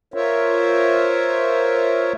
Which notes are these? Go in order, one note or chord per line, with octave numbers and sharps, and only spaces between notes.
F4 A#4 C5 C#5 E5